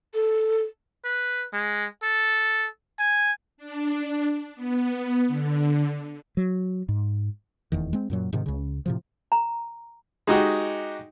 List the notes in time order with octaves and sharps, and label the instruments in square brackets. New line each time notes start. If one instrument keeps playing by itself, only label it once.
[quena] A4
[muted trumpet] B4
G#3
A4
G#5
[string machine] D4
B3
D3
[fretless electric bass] F#3
G#2
F1 E2 D#3
G#3 C4
F#2 A#2 F#3
G#2 C3 D#3
C#2 C#3
A2 C3 F3
[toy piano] A#5
[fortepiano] G#3 D#4 F#4 G4